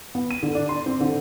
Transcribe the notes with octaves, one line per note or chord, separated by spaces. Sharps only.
B3
D#7
D3
D4
C6
C4
D3